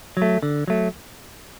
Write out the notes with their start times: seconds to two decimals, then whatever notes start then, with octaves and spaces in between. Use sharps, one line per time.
0.17 F#3 A3
0.43 D3
0.68 F#3 A3